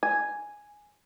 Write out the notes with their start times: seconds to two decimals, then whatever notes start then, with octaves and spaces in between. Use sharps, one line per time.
0.03 G#5